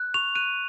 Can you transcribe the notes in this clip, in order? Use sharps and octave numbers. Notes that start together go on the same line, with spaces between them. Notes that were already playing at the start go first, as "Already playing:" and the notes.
Already playing: F#6
C#6 F7
F#6 D#7